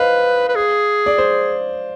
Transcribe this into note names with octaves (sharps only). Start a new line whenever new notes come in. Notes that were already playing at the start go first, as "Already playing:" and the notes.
Already playing: B4 C5 D#5 F5
B4
G#4
D5
C5